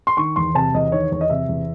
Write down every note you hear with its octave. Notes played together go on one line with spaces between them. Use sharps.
C6
D#3 C#6
E2 C6
C3 A5
E2 D#5
D#3 C#5
E2 C#5
D#5
C3 E5
E2